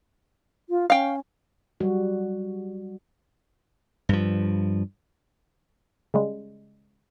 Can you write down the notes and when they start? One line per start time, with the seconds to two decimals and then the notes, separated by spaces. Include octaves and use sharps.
0.69 F4
0.90 C#4 F5 G5
1.80 F#3 G3 F#4
4.09 G2 F3
6.14 C#3 G3 G#3